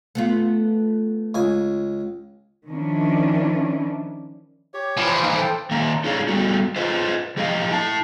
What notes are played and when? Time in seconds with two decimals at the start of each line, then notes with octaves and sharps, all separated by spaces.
0.15 A3 B3 F4
1.35 C#2 G#5
2.69 D#3 F3 C#4 D4 E4
4.74 G4 C#5
4.97 E3 F3
5.22 A#3 D#4
5.36 A4 C5 G5
5.71 D#3 A#3 E5 A#5
6.04 D#4 E4 G#4 C#5 D5 F5
6.28 G3 A3 B3 F#4
6.76 F4 B4 C5 D#5
7.37 F3 G4 D#5 F5
7.71 E4 A5